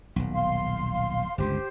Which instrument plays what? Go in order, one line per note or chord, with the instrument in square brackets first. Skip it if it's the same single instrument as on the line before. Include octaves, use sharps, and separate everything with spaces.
[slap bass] D#1 B1
[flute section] F5 C6
[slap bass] G1 C#2 D3 [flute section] G4 C5